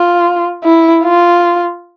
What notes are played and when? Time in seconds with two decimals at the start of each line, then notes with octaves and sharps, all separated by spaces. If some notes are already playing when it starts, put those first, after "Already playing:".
Already playing: F4
0.64 E4
1.04 F4